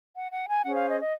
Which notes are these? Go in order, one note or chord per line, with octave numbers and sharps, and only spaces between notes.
F#5
F#5
G#5
C#4 G#4 C5 F#5
F5
D#5
D#5